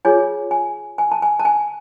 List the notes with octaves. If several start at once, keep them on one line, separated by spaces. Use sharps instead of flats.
F4 G#4 C#5 G#5
G#5
G#5
A5
G#5
A5
G#5